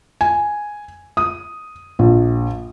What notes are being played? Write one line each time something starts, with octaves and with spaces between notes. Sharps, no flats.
G#5
D#6
A#1